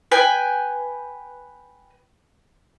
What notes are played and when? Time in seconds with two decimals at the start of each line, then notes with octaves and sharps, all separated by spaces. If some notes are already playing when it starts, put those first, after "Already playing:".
0.12 B4 G5 G#5